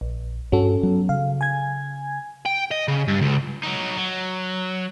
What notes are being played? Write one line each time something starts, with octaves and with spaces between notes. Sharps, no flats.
A#1
G2 C#4 F#4 A4
F#3 B3
C#3 F5
G#5 G#6
G5
D#5
C#3
G2
C#2
F#3 D#4
F#3